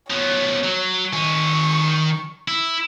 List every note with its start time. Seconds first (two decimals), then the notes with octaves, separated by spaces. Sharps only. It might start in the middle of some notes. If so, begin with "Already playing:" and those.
0.10 F3 B3 C#5
0.64 F#3
1.13 D#3 G#5 C#6
2.48 E4